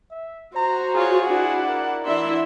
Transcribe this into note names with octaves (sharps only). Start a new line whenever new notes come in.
E5
F#4 C5 A#5
F4 G#4 C#5
D4 E4 F#5
A#4
E3 D4 E4 E5 C6